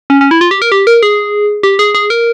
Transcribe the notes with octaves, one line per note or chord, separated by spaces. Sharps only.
C#4
C#4
E4
F4
G4
A#4
G4
A#4
G#4
G4
G#4
G#4
A#4